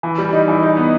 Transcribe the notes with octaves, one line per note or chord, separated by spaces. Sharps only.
E3
G3
D#4
E3
D#4
B3